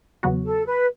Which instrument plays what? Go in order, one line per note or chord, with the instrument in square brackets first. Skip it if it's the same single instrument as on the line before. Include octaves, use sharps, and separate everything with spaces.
[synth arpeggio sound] E2 C#3 F#3 B3 F#4
[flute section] A4
B4